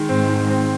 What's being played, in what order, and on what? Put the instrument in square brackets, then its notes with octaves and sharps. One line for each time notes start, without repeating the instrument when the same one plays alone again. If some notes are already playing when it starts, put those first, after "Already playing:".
Already playing: [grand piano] D#3 G#3
[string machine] G#2 [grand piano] C4
[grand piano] D#3
C4